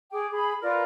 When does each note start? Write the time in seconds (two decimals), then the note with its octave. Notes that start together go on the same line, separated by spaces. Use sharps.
0.12 G#4 G5 D6
0.31 G#4 B5
0.61 F4 A#4 B4 D5